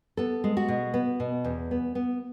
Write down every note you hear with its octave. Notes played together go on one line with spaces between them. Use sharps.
B3 A4
G#3
F#4
B2
B3
B2
E2
B3
B3